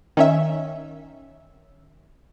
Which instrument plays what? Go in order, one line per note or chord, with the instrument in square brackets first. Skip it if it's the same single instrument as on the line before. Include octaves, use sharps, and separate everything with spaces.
[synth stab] D#3 C#4 E5